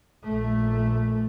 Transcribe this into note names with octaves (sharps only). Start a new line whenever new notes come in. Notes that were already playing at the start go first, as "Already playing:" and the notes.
A#1 A3